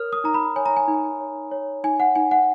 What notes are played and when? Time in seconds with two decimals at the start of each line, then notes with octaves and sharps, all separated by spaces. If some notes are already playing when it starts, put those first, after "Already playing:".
Already playing: A#4 C#5 D#6 F6
0.13 D#6
0.24 D#4 A#5
0.34 B5
0.56 C#5 G#5
0.66 A#5
0.77 G#5
0.88 D#4
1.20 C#5
1.51 C#5
1.84 D#4 G#5
2.00 F#5
2.16 D#4 G#5
2.31 F#5